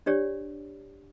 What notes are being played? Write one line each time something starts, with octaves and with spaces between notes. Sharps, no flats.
D4 G4 C#5 D5